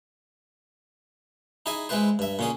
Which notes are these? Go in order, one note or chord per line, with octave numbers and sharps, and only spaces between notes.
D#4 E4 G#4 E5 G#5
G#3 C4 E4 B4 C5
G2 E5
A#2 C#4 G#4